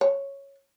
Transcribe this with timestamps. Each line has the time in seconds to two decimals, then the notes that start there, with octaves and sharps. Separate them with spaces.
0.01 C#5